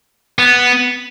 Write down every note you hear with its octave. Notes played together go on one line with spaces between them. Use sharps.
B3